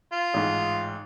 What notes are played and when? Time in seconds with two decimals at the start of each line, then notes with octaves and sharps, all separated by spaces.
0.13 F4
0.34 A1 G#2